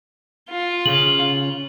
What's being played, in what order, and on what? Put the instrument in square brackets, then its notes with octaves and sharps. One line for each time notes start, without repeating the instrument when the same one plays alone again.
[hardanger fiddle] F4
[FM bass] C#3 [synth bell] F#7